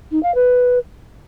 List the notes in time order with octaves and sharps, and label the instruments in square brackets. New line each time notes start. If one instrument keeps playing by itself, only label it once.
[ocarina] D#4
F5
B4